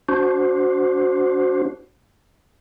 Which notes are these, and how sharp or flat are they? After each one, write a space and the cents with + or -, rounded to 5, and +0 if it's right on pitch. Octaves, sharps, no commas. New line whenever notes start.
D4 -20 F#4 +0 C5 +0